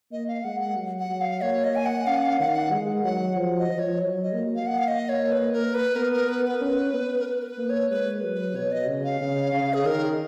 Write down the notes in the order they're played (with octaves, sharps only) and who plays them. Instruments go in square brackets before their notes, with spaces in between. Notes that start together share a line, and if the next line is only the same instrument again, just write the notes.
[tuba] A#3 [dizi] D#5
[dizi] F5
[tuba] G#3 [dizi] F#5
[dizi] F#5
[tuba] F#3
[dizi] F#5
[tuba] F#3
[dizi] F5
[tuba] A#3 [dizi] C#5
[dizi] D#5
G#5
F#5
[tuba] C#4 [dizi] F5
[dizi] F#5
F5
[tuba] D#3 [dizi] F#5
[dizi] F5
F#5
[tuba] G#3
[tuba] F#3 [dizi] F#5
[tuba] F3
[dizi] D#5
[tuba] F3
[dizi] C#5
[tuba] F#3
[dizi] D#5
[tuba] A#3
[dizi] F5
F#5
F5
D#5
C#5
B4
A#4
B4
[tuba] B3 [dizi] A#4
[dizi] A#4
B4
B4
[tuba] C#4
B3
[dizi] A#4
B4
A#4
B4
[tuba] A#3
[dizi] C#5
[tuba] G#3 [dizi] B4
[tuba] F#3
[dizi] B4
[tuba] B2 [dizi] C#5
[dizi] D#5
[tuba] C#3
[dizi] F5
[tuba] C#3
C#3
[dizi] G#4
[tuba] D#3 [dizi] A#4